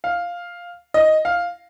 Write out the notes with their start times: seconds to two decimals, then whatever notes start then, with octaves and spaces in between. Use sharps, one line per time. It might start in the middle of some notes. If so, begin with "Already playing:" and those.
0.04 F5
0.94 D#5
1.25 F5